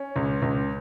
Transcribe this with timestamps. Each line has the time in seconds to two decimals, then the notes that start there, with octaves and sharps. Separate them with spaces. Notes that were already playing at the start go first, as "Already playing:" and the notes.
Already playing: C#4
0.16 C#2
0.42 C#2